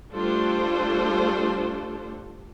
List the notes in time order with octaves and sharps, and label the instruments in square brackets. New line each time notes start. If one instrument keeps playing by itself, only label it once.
[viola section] G3 A3 D4 F4 A4 C5